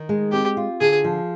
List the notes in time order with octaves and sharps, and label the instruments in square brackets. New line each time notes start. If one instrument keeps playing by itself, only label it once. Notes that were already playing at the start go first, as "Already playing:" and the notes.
Already playing: [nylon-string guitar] D#3
G#3
[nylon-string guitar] C4 [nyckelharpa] G4
[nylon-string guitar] F4
[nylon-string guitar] D3 [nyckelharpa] G#4
[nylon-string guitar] F3